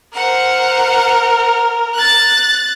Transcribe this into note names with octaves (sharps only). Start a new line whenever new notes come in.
A#4 C5 F#5
F#6 A6